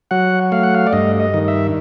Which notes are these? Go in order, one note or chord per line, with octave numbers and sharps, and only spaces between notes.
F#3 F#5
A3 F5
F#5
F5
D5
G2 D#5
D#5
D#3
E5